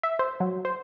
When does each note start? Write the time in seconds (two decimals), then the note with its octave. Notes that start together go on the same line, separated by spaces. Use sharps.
0.03 E5
0.19 C5
0.40 F#3
0.65 C5